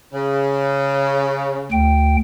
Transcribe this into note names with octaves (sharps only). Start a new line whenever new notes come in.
C#3
D2 G5